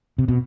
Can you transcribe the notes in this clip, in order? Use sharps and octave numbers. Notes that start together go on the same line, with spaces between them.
C3
B2